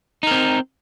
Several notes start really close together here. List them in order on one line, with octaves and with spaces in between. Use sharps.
D#4 A#4 C4